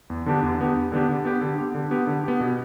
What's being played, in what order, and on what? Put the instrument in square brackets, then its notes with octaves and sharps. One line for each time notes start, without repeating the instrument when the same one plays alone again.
[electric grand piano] E2
D3 B3 D4 G4
E2
D3 B3 D4 G4
E2
D3 B3 D4 G4
D3
B3 G4
D3
B3 G4
D3
B3 G4
D3
B3 G4
B2